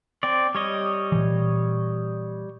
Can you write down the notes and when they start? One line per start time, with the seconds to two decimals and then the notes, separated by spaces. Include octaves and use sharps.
0.23 C4 D5
0.55 G3 C#5 D#5
1.12 A#2 E3